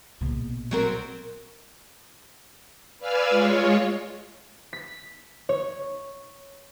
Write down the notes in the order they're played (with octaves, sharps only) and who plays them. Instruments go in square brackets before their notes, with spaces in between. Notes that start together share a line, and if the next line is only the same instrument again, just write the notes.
[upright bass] A#1 B2
[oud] F#3 C4 A#4
[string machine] B4 D5 F5 G#5 E6 F6
G#3 F4 C#5
[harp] B6
C#5